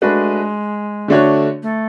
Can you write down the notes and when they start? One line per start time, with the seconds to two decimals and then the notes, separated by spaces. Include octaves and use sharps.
0.02 G#3 A3 D4 F#4 B4
1.08 D3 A3 D4 F#4 C#5
1.63 A3